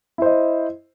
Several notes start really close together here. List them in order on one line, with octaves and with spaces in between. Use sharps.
E4 C5 D#5